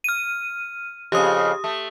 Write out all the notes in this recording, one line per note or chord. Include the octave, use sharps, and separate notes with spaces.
F6 D#7
F2 C#3 G4 D#6
A3